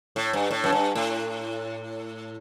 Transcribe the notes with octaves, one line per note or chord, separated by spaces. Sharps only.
A2
G2
A2
F#2
G2
A2